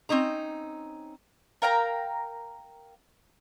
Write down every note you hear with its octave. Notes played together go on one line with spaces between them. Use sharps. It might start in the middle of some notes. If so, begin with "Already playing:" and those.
C4 C#4 D#4 A#5
A#4 F5 G5 A#5